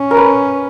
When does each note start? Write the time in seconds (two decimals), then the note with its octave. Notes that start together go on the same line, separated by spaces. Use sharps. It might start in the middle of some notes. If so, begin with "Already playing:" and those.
Already playing: C#4
0.11 A#4
0.17 B4